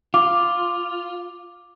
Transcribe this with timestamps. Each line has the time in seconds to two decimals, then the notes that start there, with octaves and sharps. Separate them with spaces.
0.14 F4 D6